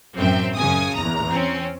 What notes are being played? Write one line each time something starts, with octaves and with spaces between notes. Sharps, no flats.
A1 F#2 C4 E5 G5
F#2 C#3 G#5 D#6
E2 A#5
C4 C#4